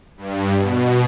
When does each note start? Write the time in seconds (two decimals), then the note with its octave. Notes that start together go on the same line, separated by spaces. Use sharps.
0.17 G2
0.56 B2